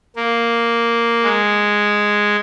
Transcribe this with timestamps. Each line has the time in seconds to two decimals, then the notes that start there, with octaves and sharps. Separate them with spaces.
0.16 A#3
1.23 G#3